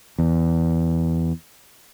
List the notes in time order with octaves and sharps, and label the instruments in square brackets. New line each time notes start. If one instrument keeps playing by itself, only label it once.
[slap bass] E2